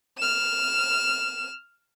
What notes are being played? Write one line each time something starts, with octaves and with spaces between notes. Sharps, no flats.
F6 E7